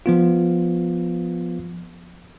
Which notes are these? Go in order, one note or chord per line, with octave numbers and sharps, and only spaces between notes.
F3 B3 F4